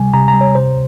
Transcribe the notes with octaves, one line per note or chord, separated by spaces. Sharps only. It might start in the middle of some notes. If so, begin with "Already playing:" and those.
Already playing: C3 G3 G#5
C3 A#5
A#5
G3
C#5
C3 C5